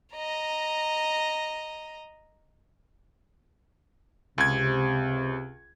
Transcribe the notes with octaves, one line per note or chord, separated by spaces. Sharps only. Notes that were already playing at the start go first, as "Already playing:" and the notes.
D#5 A#5
C#2 C3 G#6